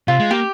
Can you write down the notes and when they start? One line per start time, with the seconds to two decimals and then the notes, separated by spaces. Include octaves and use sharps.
0.08 C3 F4
0.19 G#3
0.31 A#3 G4